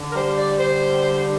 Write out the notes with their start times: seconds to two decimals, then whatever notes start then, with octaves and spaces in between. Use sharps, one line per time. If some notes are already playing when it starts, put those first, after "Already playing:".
Already playing: D3
0.10 A#4
0.15 G3 C5
0.37 D5
0.59 D3 C5
1.03 G3